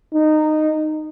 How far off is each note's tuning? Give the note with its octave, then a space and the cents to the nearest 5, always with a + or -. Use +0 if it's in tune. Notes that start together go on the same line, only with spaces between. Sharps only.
D#4 -15